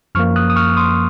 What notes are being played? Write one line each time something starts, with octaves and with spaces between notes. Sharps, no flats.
F#2 F3 A#3 C#6 F6
D#6 F#6
D#6
C#6 F6
C6 D#6